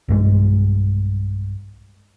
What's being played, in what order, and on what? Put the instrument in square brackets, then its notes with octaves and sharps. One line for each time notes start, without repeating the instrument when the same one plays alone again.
[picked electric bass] B1 G2 G#3